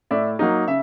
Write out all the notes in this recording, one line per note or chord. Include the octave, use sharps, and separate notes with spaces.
A2 D5 E5
F#3 A#3 D#4
C#3 E5